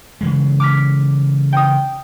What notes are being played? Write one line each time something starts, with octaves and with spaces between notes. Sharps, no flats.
C#3 E3 G#3
D6 F6 B6
G5 D#6